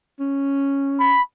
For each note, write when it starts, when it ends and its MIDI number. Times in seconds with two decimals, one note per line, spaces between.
0.20 1.14 61
1.00 1.22 83